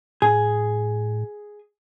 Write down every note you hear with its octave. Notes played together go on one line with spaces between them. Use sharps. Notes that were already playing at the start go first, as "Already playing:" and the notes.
A2 G#4